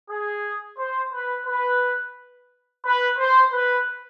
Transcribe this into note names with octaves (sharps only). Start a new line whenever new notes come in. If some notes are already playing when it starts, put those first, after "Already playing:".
G#4
C5
B4
B4
B4
C5
B4